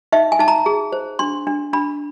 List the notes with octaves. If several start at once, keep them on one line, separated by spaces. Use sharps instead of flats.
D#4 E5
G#5
D#4 A5
A#5
G#4
C5
D4 C6
D4
D4 B5